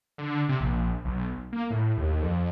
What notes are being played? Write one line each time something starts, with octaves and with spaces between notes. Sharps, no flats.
D3
C3
A#1
B1
A#3
A2
D#2
F2